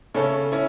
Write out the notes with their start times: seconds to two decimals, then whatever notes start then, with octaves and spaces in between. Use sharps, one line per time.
0.14 C#3 A3 C#4 A4 C#5
0.52 C#4 E4